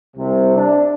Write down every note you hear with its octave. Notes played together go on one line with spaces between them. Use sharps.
C2 C3
D4